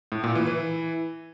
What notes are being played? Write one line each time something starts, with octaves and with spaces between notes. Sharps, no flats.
A2
A#2
E3
E3